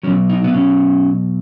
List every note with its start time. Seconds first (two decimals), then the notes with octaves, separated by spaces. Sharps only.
0.03 B2 F#3 C#4
0.29 D#4
0.44 B3
0.54 C#4